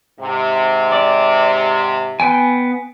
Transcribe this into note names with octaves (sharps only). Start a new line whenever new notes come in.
G#2 C3
D5
B3 G5 G#5